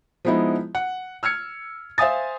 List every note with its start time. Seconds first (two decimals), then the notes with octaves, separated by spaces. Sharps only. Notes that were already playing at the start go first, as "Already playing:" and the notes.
0.25 F3 G#3 B3 D#4 E4
0.75 F#5
1.23 E6 F6 G#6 C#7
1.98 C5 E5 F5 G#5 D#6 A6